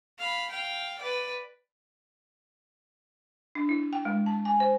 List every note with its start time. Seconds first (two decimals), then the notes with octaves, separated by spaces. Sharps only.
0.19 F5 B5
0.50 F5 G5
0.99 B4 D5
3.55 D4
3.69 E4
3.93 G5
4.05 G#3
4.26 A5
4.45 G#5
4.60 C5